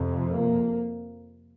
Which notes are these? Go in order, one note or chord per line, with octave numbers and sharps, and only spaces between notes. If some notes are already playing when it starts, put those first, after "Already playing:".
Already playing: F2 C3
A#3